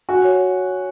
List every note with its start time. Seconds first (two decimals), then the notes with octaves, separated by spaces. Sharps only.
0.09 F#4 G#5
0.24 C#5